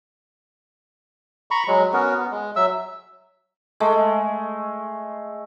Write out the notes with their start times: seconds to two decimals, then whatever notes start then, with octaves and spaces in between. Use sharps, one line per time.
1.51 A#5 B5 C#6
1.68 F#3 G#3
1.93 B3 C#4 F#4 A#4
2.17 B3
2.31 G#3
2.56 F#3 E5 E6
3.80 G#3 A3